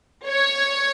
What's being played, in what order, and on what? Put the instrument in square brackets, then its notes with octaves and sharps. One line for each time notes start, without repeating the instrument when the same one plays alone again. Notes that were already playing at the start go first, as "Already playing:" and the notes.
[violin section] C#5